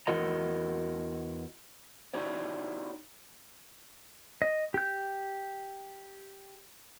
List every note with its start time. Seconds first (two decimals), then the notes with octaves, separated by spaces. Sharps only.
0.07 E2 E4 F#4 A#4 D#5 A#5
2.14 D#4 E4 F#4 G4 C#5 D5
4.42 D#5
4.74 G4 G6